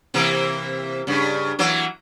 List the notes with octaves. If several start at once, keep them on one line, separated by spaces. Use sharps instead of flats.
C3 E3 A#3
G2 C#3
E3 F#3 A#3